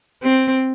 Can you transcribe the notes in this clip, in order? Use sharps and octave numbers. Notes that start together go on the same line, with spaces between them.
C4